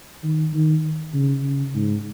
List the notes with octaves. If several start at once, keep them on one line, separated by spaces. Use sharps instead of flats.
D#3
D#3
C#3
C#3
G#2